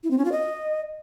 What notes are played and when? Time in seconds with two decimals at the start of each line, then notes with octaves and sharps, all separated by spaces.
0.04 E4
0.11 C4
0.18 C#4
0.25 F4
0.32 D#5